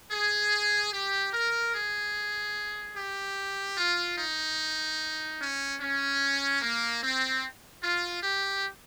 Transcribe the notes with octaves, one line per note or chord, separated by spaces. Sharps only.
G#4
G4
A#4
G#4
G4
F4
D#4
C#4
C#4
A#3
C4
F4
G4